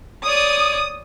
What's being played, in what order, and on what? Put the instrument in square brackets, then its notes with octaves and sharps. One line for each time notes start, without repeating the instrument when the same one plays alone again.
[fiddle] C#5 D5 [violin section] D#6